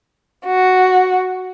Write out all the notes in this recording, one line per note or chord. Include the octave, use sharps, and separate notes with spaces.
F#4